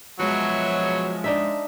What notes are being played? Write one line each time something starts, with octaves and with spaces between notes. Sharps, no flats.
B2 F3 F#3 G#3 C#5 E5
D4 D#4 E5